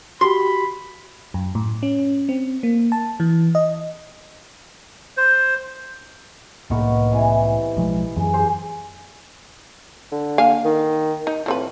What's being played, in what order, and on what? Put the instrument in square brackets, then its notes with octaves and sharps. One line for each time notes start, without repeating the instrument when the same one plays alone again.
[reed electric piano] F#4 G4 [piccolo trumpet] B5 [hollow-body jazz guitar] C6
[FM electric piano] F#2
A2
C#4
C4
A#3
A5
E3
D#5
[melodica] C5
[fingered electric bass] C2 A2 A#3 [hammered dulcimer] D#3 B3 C#6
[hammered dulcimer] C3 E3 G#5
[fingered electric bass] B1 F3 G#3
[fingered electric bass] F#2 E3 [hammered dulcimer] G#4
[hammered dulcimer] G4 G#4 C5
[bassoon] D3
[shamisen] A#3 F5 G#5
[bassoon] D#3
[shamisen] D#4
[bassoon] A2 [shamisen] F3 C4 B4